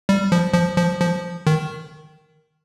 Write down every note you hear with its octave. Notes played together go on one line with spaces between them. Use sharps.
G3
F3
F3
F3
F3
D#3